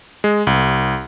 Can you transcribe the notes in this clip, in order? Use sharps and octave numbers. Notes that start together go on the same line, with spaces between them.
G#3
C2